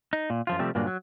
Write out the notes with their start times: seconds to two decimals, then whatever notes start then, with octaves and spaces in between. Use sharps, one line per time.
0.13 D#4
0.30 A#2
0.47 F#2 F3 F4
0.59 C3 F3 G3 A3 C4
0.75 G2 A#2 D3 F#3 A#3
0.87 F#3